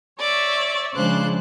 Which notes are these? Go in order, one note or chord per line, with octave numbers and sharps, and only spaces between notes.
C#5 D5 E5
C#3 F3 G#3 D4 C5 F#6